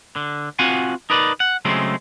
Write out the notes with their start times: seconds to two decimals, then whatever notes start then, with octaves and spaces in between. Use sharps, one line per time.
0.16 D3
0.59 C4 F4 F#4 F5 F#5 G#5
1.10 D#4 A#4 B4 D5
1.40 F#5
1.65 C#3 F#3 G#3 A3 C4